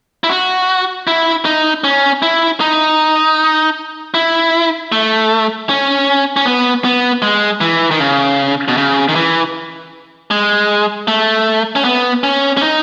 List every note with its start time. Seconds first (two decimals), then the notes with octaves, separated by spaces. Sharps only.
0.24 E4
0.29 F#4
1.07 E4
1.45 D#4
1.84 C#4
2.22 E4
2.61 D#4
4.14 E4
4.92 A3
5.69 C#4
6.36 C#4
6.46 B3
6.84 B3
7.22 G#3
7.61 E3
7.91 D#3
8.00 C#3
8.68 B2
8.77 C#3
9.09 D#3
9.15 E3
10.31 G#3
11.08 A3
11.76 C#4
11.85 B3
12.24 C#4
12.57 C#4
12.62 D#4